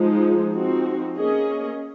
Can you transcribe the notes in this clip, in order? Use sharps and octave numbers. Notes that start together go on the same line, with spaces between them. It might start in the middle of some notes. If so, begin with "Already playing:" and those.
Already playing: F3 G#3 D#4
F3 C4 D#4 F#4
A#3 C#4 G#4 D#5